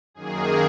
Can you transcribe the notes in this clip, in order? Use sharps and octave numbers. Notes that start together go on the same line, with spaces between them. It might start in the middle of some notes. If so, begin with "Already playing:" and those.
F#2 D#3 A#3 G#4